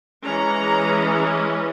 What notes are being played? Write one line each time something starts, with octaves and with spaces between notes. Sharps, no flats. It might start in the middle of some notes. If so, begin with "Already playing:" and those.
E3 G#3 C#4 A#5